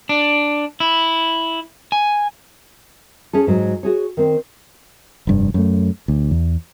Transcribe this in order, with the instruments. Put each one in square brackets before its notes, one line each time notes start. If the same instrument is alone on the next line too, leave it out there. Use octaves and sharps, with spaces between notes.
[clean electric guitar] D4
E4
G#5
[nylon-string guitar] C#4 G#4 A4
G#2 F#3
F#4 G#4 C#5
D#3 C4
[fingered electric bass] F1 G2
F#2 A3
D2
E2